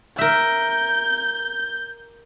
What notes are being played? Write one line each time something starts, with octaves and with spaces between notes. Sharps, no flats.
A#4 E5 G6